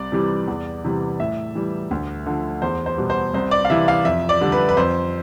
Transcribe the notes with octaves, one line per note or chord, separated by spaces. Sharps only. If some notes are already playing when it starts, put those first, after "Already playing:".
Already playing: C2 D5
C3 E3 G3
E2
C3 E3 G3
A2 E5
E3 G3
D2
D3 F3
E2 C5
C5
B2 G3
C5
C2 C5
D5
F5
C3 E3 E5
F5
F2 E5
D5
D3 G3
B4
B4
F2 C5